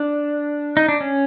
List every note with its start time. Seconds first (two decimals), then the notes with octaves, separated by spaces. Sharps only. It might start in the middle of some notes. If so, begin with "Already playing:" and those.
Already playing: D4
0.77 D#4
0.89 D4
1.01 C#4